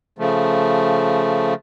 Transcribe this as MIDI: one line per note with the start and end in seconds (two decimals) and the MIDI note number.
0.19 1.54 49
0.19 1.54 53
0.19 1.54 57